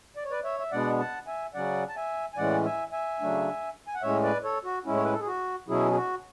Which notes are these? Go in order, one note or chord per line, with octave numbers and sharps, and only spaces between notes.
D5
C#5
B4 D5
C#5 E5
E5
B2 G#3 B3 D4 D5 F#5
F#5 A5
E5 G#5
C#3 F#3 C#4 D5 F#5
A5
E5 G#5
G#5
A2 E3 G#3 C#4 D5 F#5
E5 G#5
E5 G#5
C#3 F#3 A3 D4
G#5
F#5
A2 G#3 C#4 C#5 E5
B4 D5
A4 C#5
F#4
A2 G#3 C#4 E4
C#5
B4
A4
G#4
F#4
B2 F#3 C#4 E4 G#4
G#4
F#4